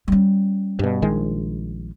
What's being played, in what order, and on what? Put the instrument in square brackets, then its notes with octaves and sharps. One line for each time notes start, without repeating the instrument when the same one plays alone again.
[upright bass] G3 C#4
[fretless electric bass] G2 B2
A#1 D#3 G#3